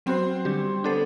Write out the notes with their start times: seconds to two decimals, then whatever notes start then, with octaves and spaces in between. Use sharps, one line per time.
0.06 F#3 B3 C4 F#4 C5
0.45 D3 G3 D4 G4
0.84 B3 D4 A4 C5